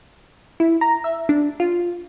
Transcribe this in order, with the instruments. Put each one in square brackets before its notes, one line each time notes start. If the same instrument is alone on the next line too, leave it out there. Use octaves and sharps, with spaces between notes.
[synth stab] E4
A#5
E5
D4
F4